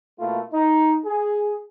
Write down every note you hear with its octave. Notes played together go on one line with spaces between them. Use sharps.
B2 A3 A#3 E4 F4
D#4
G#4